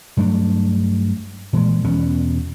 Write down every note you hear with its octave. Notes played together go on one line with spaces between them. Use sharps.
G2 F#3 A3 D4
A#2 E3 G#3
E2 B2 B3 C#4